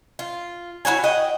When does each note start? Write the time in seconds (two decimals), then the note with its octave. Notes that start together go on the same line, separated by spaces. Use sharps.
0.19 F4
0.85 E4 F#4 C#5 G#5
1.04 D#5 F#5 G5